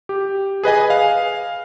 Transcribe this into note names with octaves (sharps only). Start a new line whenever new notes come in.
G4
G#4 B4 D#5 G#5
F5